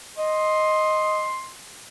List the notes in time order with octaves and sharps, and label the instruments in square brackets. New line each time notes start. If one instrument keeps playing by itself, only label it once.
[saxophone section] D#5 [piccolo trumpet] C6